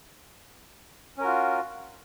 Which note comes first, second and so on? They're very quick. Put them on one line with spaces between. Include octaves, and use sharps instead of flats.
C#4 A#4 F#4 F4